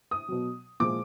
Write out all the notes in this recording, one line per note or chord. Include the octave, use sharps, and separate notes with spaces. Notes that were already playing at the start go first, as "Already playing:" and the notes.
D#6
B2 F#3
A#2 F3 G#3 D6